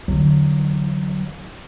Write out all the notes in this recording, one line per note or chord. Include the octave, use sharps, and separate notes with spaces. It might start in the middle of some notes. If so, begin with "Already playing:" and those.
E2 D3 F#3